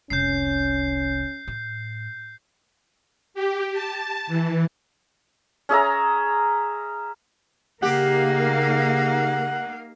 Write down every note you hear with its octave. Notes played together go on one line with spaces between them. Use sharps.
F1 C2 C#4 G6 C7
A2
G4
A5
E3
C#4 G#4 E5 A#5
C#3 A#3 D#4 G4 F5 F#5